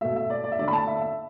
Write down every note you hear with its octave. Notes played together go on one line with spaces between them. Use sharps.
B2 A3 E5
E5
D5
D5
E5
D3 A3 D5
B5
A5
E5
E5